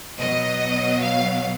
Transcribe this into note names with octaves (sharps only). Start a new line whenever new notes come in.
B2 F#3 D#5
F5